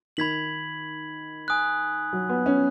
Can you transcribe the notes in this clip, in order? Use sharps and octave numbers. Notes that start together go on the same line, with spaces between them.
D#3 B5 G#6 B6 F#7
G#5 D#6 F#6
F#3
B3
C#4